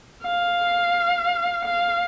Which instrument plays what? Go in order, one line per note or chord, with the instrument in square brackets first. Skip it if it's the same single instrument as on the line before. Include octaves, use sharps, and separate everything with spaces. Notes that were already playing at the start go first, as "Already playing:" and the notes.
[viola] F5
F5